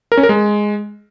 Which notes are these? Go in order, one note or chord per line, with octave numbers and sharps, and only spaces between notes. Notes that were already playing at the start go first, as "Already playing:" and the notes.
A#4
C#4
A#4
G#3